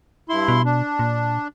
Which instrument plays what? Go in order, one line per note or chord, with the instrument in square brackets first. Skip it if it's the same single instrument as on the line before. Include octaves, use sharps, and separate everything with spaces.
[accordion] G2 E4 C6
[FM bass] B2
[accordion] D4
[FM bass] A#2